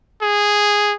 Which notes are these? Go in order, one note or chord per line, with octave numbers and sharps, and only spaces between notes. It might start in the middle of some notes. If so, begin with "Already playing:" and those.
G#4